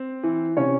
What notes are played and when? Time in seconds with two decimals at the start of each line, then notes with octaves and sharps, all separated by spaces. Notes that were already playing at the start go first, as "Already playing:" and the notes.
Already playing: C4
0.23 E3
0.57 C3 C#4 C#5